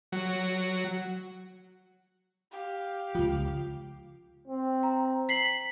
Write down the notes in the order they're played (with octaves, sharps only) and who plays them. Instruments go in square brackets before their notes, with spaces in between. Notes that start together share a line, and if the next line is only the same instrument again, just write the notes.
[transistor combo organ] F#3
[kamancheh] G4 F5
[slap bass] C#2 F3 [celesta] F4
[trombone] C4
[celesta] A#5
B6 C7 F#7